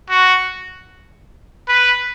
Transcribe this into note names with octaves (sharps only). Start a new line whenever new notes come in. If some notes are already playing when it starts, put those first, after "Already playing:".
F#4
B4